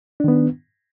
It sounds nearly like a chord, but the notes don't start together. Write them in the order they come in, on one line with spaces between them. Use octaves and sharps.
D4 D#3 B3